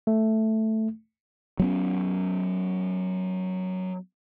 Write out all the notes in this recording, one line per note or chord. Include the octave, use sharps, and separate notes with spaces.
A3
F#3 B3 C#4